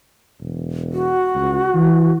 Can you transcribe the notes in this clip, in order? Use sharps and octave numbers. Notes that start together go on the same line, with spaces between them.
E1
F#4
C#2
E3